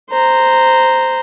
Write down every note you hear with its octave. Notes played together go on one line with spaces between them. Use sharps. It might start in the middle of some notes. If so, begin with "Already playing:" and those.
C5 A#5